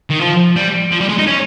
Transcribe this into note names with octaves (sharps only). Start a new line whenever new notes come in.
D#3
F3
G3
F3
G3
G#3
D#4
C#4